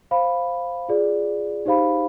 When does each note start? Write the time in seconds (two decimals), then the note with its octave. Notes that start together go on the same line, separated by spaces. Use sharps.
0.11 C5 F5 B5
0.89 F4 G#4 D5
1.65 D#4 G4 C5 F5 B5